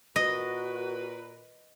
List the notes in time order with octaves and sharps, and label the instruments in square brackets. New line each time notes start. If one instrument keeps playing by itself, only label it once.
[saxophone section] A#2 A#4 B4 [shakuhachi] F#4 [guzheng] D#5